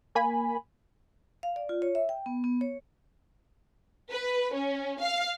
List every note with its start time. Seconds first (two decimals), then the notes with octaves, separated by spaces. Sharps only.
0.15 A#3 G#5 B5
1.43 F5
1.56 D5
1.69 F4
1.82 C#5
1.95 E5
2.09 G5
2.26 B3
2.44 B3
2.61 C#5
4.11 B4
4.54 C#4
5.01 F5